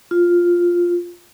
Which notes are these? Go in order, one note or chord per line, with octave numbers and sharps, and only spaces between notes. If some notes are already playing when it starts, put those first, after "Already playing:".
F4